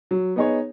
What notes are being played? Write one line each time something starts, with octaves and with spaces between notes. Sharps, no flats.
F#3
B3 D#4 G#4 C#5